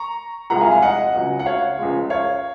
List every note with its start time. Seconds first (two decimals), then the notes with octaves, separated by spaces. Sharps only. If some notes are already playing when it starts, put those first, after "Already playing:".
Already playing: A#5 C#6
0.50 C2 C3 F3 G#3 F#5 A#5
0.61 F5 G#5
0.71 F5 G#5
0.82 D#5 F#5
1.14 C#2 C#3 F#3
1.39 F#5
1.46 C#5 F5
1.78 C#2 C#3 F3 G#3
2.10 C#5 F5